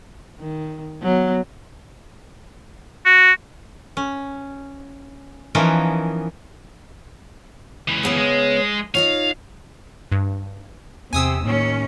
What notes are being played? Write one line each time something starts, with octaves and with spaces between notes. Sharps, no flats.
D#3
F#3 B3
F#4
C#4
E3 F3 B3 C#4 D#4 A#4
C#2 E3
C#3 B3 C#4
G#3
D#4 F4 C#5 F5
G2
E2 C3 G#5 D#6 E6
D#2 A2 C#4